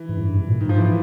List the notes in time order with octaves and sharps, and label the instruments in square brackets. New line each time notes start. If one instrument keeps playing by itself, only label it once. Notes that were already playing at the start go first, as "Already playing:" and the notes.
Already playing: [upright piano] E3
[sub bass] G#2
F#2
G2
G#2
A#2
[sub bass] G#2 [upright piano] D#3
[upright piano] F3
E3